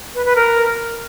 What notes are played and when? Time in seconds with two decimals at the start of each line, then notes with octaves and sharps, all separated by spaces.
0.15 B4
0.25 B4
0.36 A#4